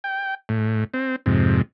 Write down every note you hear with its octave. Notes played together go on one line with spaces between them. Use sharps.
G5
A2
C4
F2 G#2 C3